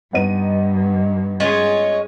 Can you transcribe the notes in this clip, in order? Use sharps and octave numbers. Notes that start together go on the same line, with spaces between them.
G2 B3 D#4 D#7
G#3 C#4 F4 G#4 C#5